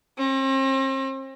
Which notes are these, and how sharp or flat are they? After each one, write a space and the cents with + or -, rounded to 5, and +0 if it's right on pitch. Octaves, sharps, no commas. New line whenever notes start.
C4 +40